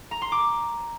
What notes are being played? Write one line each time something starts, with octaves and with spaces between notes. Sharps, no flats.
A#5
C6
D6